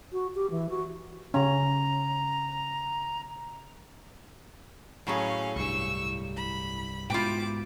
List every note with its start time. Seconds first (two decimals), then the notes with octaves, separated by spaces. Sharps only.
0.12 F#4
0.35 G4
0.50 E3
0.69 F#4
1.34 C#3 C#4 A#5
5.07 A2 F#3 C#4 G#4 F5
5.56 C2 G2 C#6 E6
6.37 B5
7.10 G#2 B2 E4 F4 G5 D6